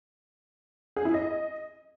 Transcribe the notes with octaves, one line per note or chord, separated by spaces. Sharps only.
G#4
E4
D#5